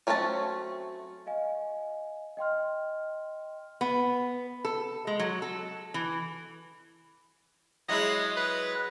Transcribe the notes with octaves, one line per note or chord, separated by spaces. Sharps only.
F#3 A3 C4 C#4 A5
D#5 F5 G#5
D#5 G5 C6 F6
B3
A4
G#3
F#3
A4
E3
F#3 G#3 E4 D#5
B4